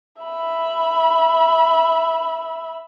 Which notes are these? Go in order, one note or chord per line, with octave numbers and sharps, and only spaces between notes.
E5 B5